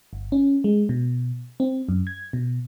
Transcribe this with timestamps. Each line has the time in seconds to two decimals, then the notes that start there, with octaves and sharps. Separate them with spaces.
0.13 G1
0.32 C#4
0.64 G#3
0.89 B2
1.60 C4
1.89 F#2
2.07 G#6
2.33 B2